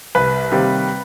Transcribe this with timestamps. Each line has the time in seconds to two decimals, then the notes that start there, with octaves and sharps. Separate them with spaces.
0.15 C2 B4
0.51 C3 D#3 G3 A#3